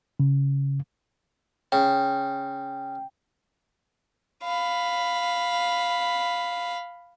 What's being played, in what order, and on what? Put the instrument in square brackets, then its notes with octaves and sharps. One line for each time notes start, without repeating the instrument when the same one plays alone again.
[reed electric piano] C#3
[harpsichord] C#3 [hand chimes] G5
[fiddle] F5 B5